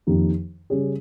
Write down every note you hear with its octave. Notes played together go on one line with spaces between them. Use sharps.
F2 D#3 A#3 D#4 G4
C#3 G3 C#4 G#4